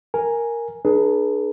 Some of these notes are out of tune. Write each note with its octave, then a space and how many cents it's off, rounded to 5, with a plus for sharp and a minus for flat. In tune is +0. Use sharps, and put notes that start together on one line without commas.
A#4 +0 G#5 +0
D4 +30 G#4 +20 B4 -35